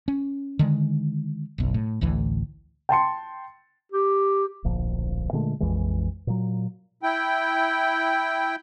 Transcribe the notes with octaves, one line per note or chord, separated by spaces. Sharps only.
C#4
D3 D#3 G#3
F#1 B1
A2
A1 D2 A2 E3
G5 A5 C6 C#7
G4
D1 A#1 F3
A#2 D3 G#3 A3
A#1 F2 E3 G#3
A#2 F#3
E4 G5